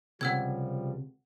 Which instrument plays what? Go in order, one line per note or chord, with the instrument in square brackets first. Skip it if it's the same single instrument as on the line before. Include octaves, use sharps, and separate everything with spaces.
[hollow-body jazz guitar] C#2 C3 [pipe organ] F3 G3 [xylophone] F#5 E6 G#6